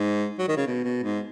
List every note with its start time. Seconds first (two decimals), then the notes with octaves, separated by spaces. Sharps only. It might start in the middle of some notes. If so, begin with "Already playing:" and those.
Already playing: G#2
0.39 F#3
0.48 D#3
0.57 C#3
0.67 B2
0.85 B2
1.03 G#2